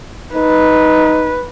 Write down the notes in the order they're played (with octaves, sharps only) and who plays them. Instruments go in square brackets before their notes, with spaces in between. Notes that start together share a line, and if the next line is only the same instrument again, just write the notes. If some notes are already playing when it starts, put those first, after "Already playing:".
[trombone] D#4 [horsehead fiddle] B4